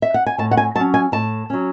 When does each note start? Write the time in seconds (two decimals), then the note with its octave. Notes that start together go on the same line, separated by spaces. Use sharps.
0.02 E5
0.14 F#5
0.26 G#5
0.38 A2 A5
0.51 F#5
0.57 G#5
0.75 F#3 A5
0.80 C#4
0.94 G#5
1.12 A2 A5
1.50 F#3 C#4